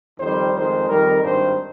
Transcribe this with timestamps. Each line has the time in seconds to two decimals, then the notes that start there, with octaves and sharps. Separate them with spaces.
0.19 F2 D#3 G3 C5
0.53 F2 D#3 G#3 C5
0.87 F2 D#3 G3 A#4
1.22 G#1 G2 D#3 C5